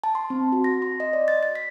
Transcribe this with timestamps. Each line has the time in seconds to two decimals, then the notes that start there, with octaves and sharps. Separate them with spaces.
0.04 A5
0.15 C6
0.30 C4
0.52 F#4
0.64 A#6
0.82 C6
1.00 D#5
1.13 D5
1.28 A6
1.43 A6
1.55 B6